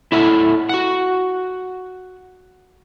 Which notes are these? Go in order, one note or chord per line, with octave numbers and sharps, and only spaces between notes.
E4 A4 E5 F#5
F#4 F#5